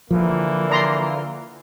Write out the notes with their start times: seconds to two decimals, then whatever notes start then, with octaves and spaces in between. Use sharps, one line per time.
0.11 D3 E3 F3 A#3
0.70 D5 A#5 C6